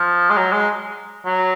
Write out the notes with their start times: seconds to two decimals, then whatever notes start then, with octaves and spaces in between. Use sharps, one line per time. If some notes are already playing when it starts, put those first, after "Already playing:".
Already playing: F3
0.30 G#3
0.37 F#3
0.52 G#3
1.26 F#3